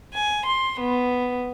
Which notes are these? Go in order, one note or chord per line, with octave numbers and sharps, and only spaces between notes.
G#5
C6
B3